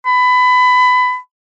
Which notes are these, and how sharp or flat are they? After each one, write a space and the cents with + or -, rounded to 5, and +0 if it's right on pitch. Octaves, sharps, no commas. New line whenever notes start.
B5 +20